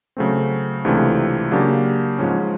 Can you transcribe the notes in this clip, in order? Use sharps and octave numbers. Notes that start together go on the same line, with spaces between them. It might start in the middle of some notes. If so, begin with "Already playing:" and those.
C#3 F#3 A3 C4
C#2 C3 E3 A3 D4
C#3 F#3 A#3 D4 G4
G#2 F3 G#3 C#4